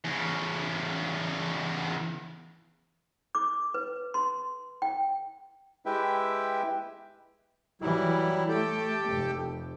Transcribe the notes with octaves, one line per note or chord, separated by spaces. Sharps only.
E2 C#3
D6
B4
C6
G5
G#3 E4 G4 B4 E5 G5
E3 F#3 G3 E4
A3 G4 A4 G5
F1